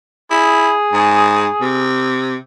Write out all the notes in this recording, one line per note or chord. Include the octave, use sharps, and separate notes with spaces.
E4 G#4
G#2
C3